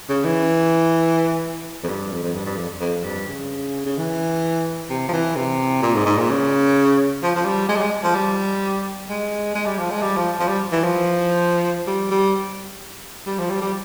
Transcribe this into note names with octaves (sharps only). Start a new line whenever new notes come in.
C#3
E3
F2
G2
F2
F2
G2
G2
F2
F2
G2
C#3
C#3
E3
C3
F3
E3
C3
A#2
G#2
G#2
A#2
C#3
F3
F3
G3
G#3
G3
G#3
F3
G3
G#3
G#3
G3
F3
G#3
G3
F3
F3
G3
E3
F3
G3
G3
G3
F3
G3
G3